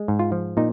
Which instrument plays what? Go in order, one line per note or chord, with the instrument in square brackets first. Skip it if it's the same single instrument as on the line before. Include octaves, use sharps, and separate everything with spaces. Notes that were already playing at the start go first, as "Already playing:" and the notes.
Already playing: [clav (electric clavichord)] G#3
G#2
F4
F3
A#2 D#4